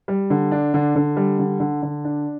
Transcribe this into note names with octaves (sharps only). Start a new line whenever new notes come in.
G3
D3
D4
D3
D3
G3
D3
D3
D3
D4